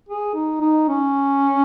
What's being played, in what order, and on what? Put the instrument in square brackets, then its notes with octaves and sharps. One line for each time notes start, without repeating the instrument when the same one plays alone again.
[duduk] G#4
D#4
D#4
C#4